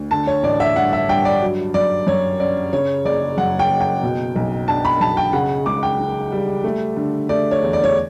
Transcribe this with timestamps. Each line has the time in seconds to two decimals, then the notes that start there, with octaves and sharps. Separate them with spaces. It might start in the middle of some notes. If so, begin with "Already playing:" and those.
Already playing: D2
0.11 D3 A5
0.27 C#5
0.43 A1 D5
0.60 E5
0.76 G2 F#5
0.93 E5
1.09 G2 G5
1.25 D5
1.42 F#3
1.74 F#2 D5
2.07 F#2 C#5
2.40 C#4 D5
2.73 C#3 C#5
3.05 F#1 D5
3.37 F#2 F#5
3.59 G5
3.70 F#1
3.81 G5
4.03 B2
4.36 B1
4.68 D4 A5
4.85 B5
5.00 B1 A5
5.17 G5
5.33 C#3 F#5
5.66 C#2 D6
5.83 G5
5.99 C#3
6.32 G3
6.64 A3
6.96 D3
7.29 A3 D5
7.51 C#5
7.62 E2
7.73 D5
7.84 C#5